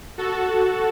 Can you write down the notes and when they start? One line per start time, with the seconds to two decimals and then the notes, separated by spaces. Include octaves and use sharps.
0.18 F#4 A4